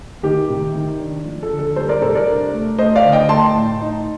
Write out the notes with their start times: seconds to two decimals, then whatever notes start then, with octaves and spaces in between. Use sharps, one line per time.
0.23 D#3 G4
0.50 C3
0.74 D#3
1.00 D4
1.25 F3
1.43 A4
1.50 D3
1.59 A4
1.76 G3 A4 C5
1.89 A#4 D5
2.01 C3 A4 C5
2.15 A#4 D5
2.28 D4
2.53 A3
2.79 A3 C5 D#5
2.96 D5 F5
3.04 D3
3.12 D#5 G5
3.29 A3 A5 C6
3.55 A2
3.80 D#4